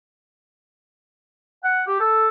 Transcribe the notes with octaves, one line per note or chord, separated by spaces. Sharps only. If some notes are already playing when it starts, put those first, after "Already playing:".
F#5
G4
A4